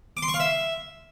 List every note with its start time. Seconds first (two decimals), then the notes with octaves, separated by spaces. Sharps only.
0.17 D6
0.23 C6
0.28 C#6
0.34 F5
0.40 E5